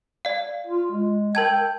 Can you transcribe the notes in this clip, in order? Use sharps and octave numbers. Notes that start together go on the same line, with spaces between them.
D5 F5
F4
G#3
A#4 G5 A5 G#6